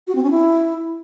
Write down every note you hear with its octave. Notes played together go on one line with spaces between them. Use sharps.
F#4
C4
C#4
E4